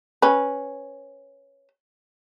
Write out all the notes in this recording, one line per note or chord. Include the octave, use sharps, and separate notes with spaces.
C#4 B4